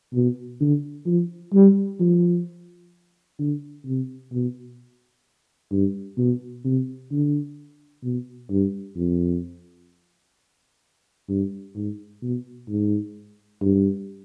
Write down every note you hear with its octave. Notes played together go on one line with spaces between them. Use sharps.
B2
D3
F3
G3
F3
D3
C3
B2
G2
B2
C3
D3
B2
G2
F2
G2
G#2
B2
G#2
G2